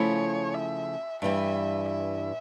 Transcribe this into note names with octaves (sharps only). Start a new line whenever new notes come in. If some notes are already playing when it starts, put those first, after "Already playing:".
Already playing: C#3 F3 A3 E4 C#5
E5
G2 E3 G3 E5
E5